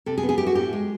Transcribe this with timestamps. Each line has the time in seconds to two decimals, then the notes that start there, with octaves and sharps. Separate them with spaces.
0.06 C3 A4
0.18 G#4
0.23 B3
0.29 G#4
0.38 A3 G4
0.47 F#4
0.55 A2 G4
0.73 G#3